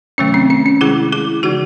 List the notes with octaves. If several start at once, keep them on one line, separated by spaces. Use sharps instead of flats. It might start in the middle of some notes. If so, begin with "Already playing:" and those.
C3 D#3 F#3 A3 C#4
C4
C#4
C#4
C3 D#3 G#3 E4 G#4
E4 G#4
C#3 E3 G#3 D#4 F#4